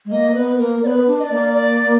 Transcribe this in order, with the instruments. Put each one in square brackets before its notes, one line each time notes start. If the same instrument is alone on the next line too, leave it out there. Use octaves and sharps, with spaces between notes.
[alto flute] G#3
[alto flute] A#3 [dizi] D#5
[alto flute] B3 [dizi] B4
[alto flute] A#3 [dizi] A#4
[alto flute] B3 [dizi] D5
[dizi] B4
[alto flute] D4
[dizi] D#5
D5
[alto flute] A#3
[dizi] D5